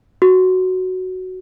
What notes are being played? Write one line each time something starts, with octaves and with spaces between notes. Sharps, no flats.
F#4